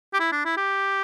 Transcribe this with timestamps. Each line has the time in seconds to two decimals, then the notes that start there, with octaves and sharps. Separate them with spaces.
0.14 G4
0.20 E4
0.32 D4
0.45 E4
0.57 G4